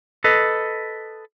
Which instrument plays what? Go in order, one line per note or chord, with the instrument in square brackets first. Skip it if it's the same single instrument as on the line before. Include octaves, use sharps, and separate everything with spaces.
[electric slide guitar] A4 B4 D#5